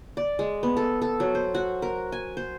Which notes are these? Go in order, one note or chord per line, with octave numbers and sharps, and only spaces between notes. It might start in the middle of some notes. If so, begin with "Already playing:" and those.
D5
G#3
B3
A4
A4
F#3
C5
F#4
A#4
G#5
C5